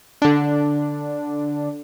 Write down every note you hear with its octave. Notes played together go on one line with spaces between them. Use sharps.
D3 D4